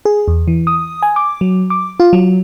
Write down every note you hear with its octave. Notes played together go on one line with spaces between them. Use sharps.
G#4
E2
E3
D#6
G#5
D6
F#3
D6
F4
F#3